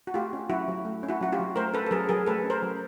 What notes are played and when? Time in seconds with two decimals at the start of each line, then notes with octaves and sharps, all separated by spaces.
0.07 F#4
0.14 A3 F4 G4
0.33 C#4
0.50 F#3 E4 F#4
0.68 F#3
0.85 A3
1.03 C#4
1.09 E4 F#4
1.21 F#3 F#4
1.32 F4 G4
1.39 F#3
1.56 A3 A#4 C5
1.73 C#4 A4 B4
1.87 A4
1.91 F#3 G#4 A#4
2.09 F#3 G#4 A#4
2.26 A3 A4 B4
2.44 C#4
2.50 A#4 C5
2.63 F#3